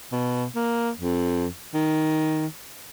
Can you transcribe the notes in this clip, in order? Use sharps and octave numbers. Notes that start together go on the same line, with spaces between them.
B2
A#3
F2
D#3